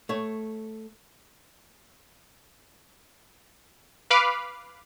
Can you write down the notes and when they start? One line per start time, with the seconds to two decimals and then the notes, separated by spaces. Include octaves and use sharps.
0.09 A3 C#5
4.10 B4 F5 B5 D6